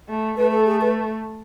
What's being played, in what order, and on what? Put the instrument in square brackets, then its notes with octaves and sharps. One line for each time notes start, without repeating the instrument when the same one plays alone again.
[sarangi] A3
[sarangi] A3 [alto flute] B4
[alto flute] A4
G#4
B4